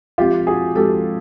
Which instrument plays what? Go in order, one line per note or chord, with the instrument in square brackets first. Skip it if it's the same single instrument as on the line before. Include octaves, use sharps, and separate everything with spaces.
[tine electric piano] F3 G#3 C4 [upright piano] F4 G4
[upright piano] F#4 G#4
[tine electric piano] F3 G#3 C4 [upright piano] G4 A4